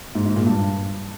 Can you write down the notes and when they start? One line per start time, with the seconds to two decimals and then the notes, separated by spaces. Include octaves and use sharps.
0.15 G#2
0.26 G#2
0.36 A#2
0.47 G2